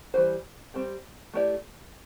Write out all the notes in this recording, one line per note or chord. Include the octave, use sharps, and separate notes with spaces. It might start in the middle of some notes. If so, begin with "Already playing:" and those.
E3 G3 E4 G4 C5
G3 C4 G4
A3 E4 G4 D5